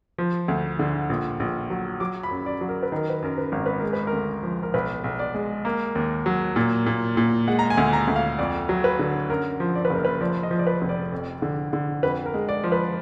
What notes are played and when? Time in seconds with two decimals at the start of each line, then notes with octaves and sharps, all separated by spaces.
0.18 F3
0.48 D2
0.79 D3
1.09 A#1
1.40 A#1
1.70 F#3
2.00 F#3 D6
2.23 B5
2.31 F#2
2.46 D5
2.61 F#3
2.69 A#4
2.83 B4
2.92 D#3 A#4
3.10 B4
3.22 F#2 A#4
3.38 B4
3.52 G#1 A#4
3.66 B4
3.79 G#3 A#4
3.93 B4
4.07 A#4
4.13 D2
4.43 F3
4.63 A#4
4.74 B1 B4
5.04 B1
5.19 D5
5.35 G#3
5.65 A#3
5.95 D#2
6.26 F#3
6.56 A#2
6.86 A#2
7.17 A#2
7.48 G#3 F#5
7.59 A#5
7.70 G#5
7.78 D2
7.93 A#5
8.08 D2
8.16 F5
8.39 F2 D5
8.69 F#3
8.84 B4
8.99 D3
9.30 F#2 A#4
9.60 F3
9.75 D5
9.85 B4
9.90 F#1 A#4
10.05 B4
10.21 F3 D5
10.43 D#5
10.51 F3
10.59 D5
10.67 B4
10.82 F1
10.89 D5
11.12 F2
11.42 D3
11.73 D3
12.03 F2 B4
12.26 A#4
12.34 G#3
12.49 D5
12.64 F3
12.72 B4